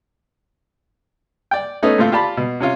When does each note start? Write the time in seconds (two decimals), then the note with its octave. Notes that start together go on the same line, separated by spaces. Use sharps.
1.51 D5 G5
1.83 A3 B3 C#4 D#4
1.98 A2 A3 C4 F4
2.12 F4 G4 D5 A5 B5
2.37 B2
2.60 C3 C#4 F4